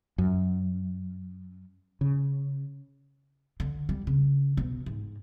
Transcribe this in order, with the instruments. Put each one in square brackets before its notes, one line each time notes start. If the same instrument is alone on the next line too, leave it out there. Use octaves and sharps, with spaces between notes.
[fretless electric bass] F#2
C#3
[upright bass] D3
G3
C#3
B2
G#2